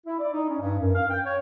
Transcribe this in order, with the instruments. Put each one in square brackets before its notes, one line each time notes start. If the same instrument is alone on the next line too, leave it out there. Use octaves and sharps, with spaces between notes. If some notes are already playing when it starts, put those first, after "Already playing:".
[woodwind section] E4
D5
D#4
C#4
G2
F#2
F5
G5
C#5